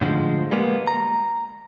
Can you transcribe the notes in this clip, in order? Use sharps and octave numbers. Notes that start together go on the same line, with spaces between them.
A2 D3 E3 F3 G#3
G3 G#3 A#3 B3
A#5